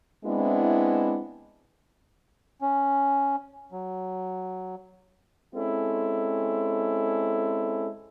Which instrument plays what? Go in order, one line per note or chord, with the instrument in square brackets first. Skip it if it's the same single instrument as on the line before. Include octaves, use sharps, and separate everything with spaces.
[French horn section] G#3 B3 C4 D4 E4
[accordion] C#4
F#3
[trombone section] G#3 C4 C#4 E4 A4